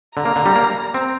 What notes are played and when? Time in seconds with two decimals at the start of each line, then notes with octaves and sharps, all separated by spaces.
0.16 D3 A#5
0.25 A#3
0.36 D3
0.46 G3
0.56 A#3
0.94 C4